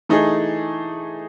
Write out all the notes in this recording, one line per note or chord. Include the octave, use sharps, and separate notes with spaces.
E3 A3 D#4 G#4